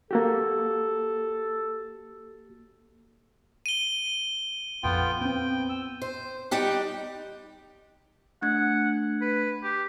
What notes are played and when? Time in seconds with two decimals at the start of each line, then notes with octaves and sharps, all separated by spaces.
0.11 A#3 F#4 G4 A4
3.66 D#7 G7
4.83 A#1 F2 B3 F4 F#5 G5
5.21 B3 C4 G5
5.69 E6
6.02 C5
6.51 G3 D#4 G4 F#5
8.42 A3 D4 F#5 G#6
9.22 B4
9.64 G4